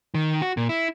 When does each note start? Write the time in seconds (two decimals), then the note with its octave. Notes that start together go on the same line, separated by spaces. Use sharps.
0.14 D#3
0.42 F#4
0.57 A#2
0.69 E4